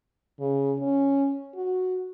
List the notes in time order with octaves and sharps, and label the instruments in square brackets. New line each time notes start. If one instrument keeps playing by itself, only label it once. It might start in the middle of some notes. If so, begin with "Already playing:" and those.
[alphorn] C#3
C#4
F#4